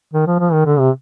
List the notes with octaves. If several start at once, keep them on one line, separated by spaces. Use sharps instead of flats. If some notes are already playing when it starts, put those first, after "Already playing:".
D#3
F3
F3
D#3
D3
C3